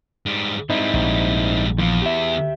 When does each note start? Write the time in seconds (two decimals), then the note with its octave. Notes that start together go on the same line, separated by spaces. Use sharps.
0.26 G#2 G3
0.70 G#2 G3 C4 D#4 E4
0.94 A#1
1.78 E2 D#3 F3
2.02 G4 E5